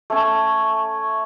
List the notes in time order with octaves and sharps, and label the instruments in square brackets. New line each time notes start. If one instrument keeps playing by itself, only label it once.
[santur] A3 C#4